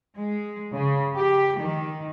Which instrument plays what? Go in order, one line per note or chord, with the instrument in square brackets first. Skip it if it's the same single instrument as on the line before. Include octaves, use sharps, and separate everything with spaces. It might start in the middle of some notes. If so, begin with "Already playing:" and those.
[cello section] G#3
C#3
G4
D#3